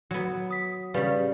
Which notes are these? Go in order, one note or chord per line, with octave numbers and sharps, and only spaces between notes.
F#3 B3
D#6 B6
C#3 G3 G4 B4 F5